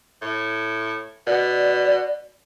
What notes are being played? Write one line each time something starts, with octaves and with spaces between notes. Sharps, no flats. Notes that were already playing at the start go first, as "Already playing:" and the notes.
A2
B2 D5